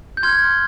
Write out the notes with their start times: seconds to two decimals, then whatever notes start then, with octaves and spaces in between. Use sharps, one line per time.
0.17 G6
0.23 C6 F6 G#6